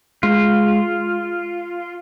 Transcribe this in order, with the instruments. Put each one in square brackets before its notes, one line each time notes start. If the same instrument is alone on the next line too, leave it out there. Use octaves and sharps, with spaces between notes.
[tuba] G#3 [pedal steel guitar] F4